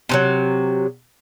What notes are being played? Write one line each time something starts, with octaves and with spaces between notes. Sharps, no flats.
C3 E3 F#3